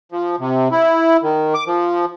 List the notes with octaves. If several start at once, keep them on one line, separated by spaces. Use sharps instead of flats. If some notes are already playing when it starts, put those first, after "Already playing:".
F3
C3
E4
D#3
D6
F3